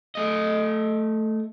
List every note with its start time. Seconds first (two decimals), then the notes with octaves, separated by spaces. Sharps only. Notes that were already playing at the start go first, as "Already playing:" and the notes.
0.15 A3 D#5